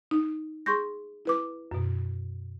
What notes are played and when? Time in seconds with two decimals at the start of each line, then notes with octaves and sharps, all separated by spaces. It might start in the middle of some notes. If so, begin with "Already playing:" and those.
0.11 D#4
0.66 G#4 C6 C#6 G6 A#6
1.25 E4 B4 D6
1.71 F#2 B2